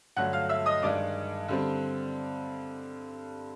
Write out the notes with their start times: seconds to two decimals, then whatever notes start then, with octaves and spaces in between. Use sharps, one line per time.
0.16 G2 D3 F#3 A3 F#5 F#6
0.33 F5 F6
0.49 E5 E6
0.66 D#5 D#6
0.82 G2 D#3 G#3 D5 D6
1.48 D3 G3 C4